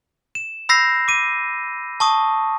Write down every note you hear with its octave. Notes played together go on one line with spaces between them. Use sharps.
E7
B5 E6 G6 A#6 C7
D6 D#7
A5 C#6 D#6